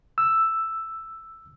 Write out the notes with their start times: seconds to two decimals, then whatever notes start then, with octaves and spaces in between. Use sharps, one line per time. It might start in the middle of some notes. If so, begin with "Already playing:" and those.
0.18 E6